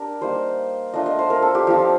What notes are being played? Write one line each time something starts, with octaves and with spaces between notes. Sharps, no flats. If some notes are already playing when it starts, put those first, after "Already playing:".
Already playing: D4 G4 A#4
G3 A#3 D#4 C5
A3 D4 F4 D#5
D#5
C5
A#4
A4
G4
F3 C4 F4 G4